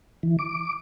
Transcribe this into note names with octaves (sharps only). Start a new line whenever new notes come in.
E3
D6